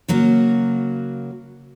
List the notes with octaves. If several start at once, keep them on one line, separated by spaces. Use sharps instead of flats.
C#3 F#3 A#3 F#4